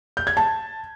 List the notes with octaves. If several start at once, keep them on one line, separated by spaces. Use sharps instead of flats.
G6
G#6
A5